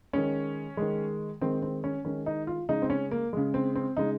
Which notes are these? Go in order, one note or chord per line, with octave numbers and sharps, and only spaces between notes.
D#3 G#3 C#4
D#3 G#3
D#3 G#3 C4
C4
C#4
D#3 G#3 C#4
D#4
F4
C#3 G#3 D#4
C4
C#4
A#3
C#3 G#3
C4
C4
C#3 G#3 D#4